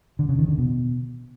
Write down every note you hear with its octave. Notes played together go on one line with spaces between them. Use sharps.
D3
C#3
D#3
D3
B2